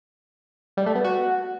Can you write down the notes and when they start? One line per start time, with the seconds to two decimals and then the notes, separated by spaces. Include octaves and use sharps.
0.77 G3
0.86 A3
0.95 B3
1.04 F#4